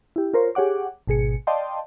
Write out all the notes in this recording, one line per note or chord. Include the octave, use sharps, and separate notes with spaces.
E4 G4
F4 A#4 C5 C#5
G4 G#4 C#5 F#5 D6
G#1 B2 G#4 C#7
D5 D#5 F5 G5 A5 C6